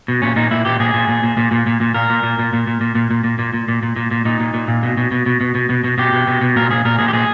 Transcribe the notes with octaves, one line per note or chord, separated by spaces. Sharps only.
B2
A#2 C#4
A#2 D#4
A#2 E4
A#2 G4
A#2 G#4
A#2
A#2
A#2
A#2
A#2
A#2
A#2
A#2 A#4
A#2
A#2
A#2
A#2
A#2
A#2
A#2
A#2
A#2
A#2
A#2
A#2
A#2
A#2
A#2
A#2 D#4
A#2
A#2
A#2
B2
B2
B2
B2
B2
B2
B2
B2
B2 G4
B2
B2
B2
A#2 A#4
A#2 G#4
A#2 A#4
A#2 G#4
G4
A#2 G#4